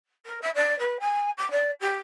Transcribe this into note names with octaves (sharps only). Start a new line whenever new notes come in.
A#4
E5
D5
B4
G#5
D6
D5
G4